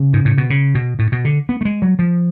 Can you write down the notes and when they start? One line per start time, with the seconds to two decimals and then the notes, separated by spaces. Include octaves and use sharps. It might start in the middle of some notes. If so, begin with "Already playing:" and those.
Already playing: C#3
0.13 G#2
0.25 A2
0.38 B2
0.50 C#3
0.75 B2
0.99 A2
1.12 B2
1.25 D3
1.49 B3
1.61 A3
1.65 G#3
1.82 F#3
1.99 F3